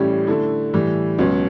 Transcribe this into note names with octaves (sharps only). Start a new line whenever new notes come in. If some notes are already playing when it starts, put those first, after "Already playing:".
Already playing: A1 A2 G3 C#4 G4
D3 A3 E4
A2 E3 G3
C#2 B2 F#3 C#4